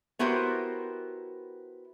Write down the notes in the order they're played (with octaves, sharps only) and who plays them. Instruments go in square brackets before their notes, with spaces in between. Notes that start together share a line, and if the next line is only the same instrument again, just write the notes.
[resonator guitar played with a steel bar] B3 E4 F#4 G4 A#4 C5